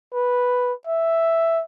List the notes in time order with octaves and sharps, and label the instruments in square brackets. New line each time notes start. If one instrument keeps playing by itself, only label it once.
[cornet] B4
E5